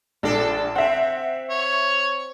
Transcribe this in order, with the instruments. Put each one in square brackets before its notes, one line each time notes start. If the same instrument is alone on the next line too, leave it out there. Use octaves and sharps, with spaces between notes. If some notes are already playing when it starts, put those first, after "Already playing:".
[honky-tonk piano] A#1 [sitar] D4 A4
[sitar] C4 [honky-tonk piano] E5 F#5
[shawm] C#5